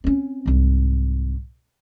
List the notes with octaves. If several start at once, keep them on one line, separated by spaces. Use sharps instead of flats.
C4 C#4
C2 G#2